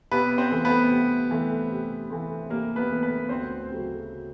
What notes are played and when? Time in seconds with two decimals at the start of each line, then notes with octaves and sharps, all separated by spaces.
0.11 C3 B3 B4
0.38 C4 C5
0.51 E3 A3 C4
0.65 B3 B4
0.90 C3
1.31 E3 A3 C4
1.71 C3
2.10 E3 A3 C4
2.50 C3 A#3 A#4
2.76 B3 B4
2.89 E3 A3 C4
3.03 B3 B4
3.29 D2 C4 C5
3.70 C#3 F#3 A3